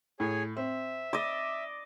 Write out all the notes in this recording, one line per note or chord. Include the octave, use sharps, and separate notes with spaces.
A2 G#4 C#5 G#5
C4 E5
D5 D#5